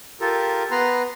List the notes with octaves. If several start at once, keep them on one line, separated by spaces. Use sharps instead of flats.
F4 G4 A4 A#4
B3 B4 A#5 C6